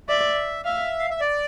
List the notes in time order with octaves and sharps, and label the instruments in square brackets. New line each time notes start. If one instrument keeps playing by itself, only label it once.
[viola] D5 [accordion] E5
[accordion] E5 [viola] F5
[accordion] F5
E5
D5